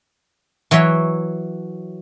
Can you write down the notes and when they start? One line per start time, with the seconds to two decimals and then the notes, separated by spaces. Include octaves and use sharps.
0.71 E3 F#3 C#5 E5